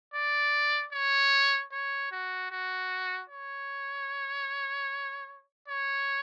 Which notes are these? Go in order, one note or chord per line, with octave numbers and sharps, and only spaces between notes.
D5
C#5
C#5
F#4
F#4
C#5
C#5